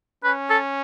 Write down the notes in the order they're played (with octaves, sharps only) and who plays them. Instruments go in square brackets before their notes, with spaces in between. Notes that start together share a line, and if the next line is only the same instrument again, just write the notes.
[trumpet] C#4 [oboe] B4
[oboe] A4